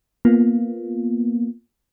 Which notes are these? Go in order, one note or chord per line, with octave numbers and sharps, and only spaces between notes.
A#3 B3 F4